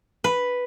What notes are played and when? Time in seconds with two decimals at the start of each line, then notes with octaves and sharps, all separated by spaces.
0.24 B4